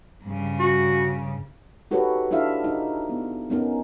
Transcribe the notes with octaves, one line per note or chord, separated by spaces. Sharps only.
G2 C#3
F#4
D#4 F#4 G4 A4 B4 C#5
D4 E4 A4 E5 F5
D#4
B3
B3 C#4 D#4 A#4